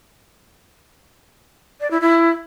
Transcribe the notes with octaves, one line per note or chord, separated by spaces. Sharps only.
D5
E4
E4